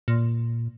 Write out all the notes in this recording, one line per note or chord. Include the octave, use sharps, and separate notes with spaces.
A#2